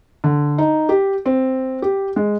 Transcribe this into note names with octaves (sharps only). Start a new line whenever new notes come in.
D3
D#4
G4
C4
G4
G#3